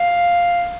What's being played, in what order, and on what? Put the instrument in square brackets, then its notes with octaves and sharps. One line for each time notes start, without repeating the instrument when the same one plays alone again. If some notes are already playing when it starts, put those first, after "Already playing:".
Already playing: [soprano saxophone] F5